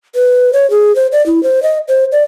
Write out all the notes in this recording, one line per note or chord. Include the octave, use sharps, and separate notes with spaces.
B4
C#5
G#4
C5
D5
E4
C5
D#5
C5
D5